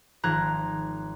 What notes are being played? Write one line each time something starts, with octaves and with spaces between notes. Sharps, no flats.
G#1 F3 A#5 F#6 G#6